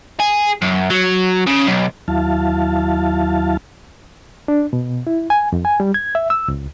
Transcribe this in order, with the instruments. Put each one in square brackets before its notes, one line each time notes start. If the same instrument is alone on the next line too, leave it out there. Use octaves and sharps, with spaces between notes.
[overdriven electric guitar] G#4
F#2
F#3
C#3
B1
[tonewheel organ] D#2 F#3 E4 F5 A5
[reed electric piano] D4
B2
E4
G#5
F2
G#5
G3
G#6
E5
E6
C#2